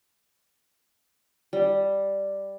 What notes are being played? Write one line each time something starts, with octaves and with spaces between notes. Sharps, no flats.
G3